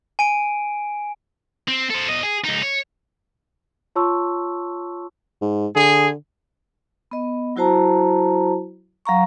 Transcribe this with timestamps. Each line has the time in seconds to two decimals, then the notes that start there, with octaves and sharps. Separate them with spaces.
0.19 G#5 D7
1.68 C4
1.90 A4 C5
2.08 E2 D#5
2.23 G#4
2.44 C#2 D#4
2.62 C#5
3.96 F4 C#5 A5 C6 C#6 E6
5.42 G#2
5.76 D3 G#4
7.11 B3 D#5
7.56 F#3 E4 F#4 C5 A5 A#5
9.06 F#3 F5 A#5 C#6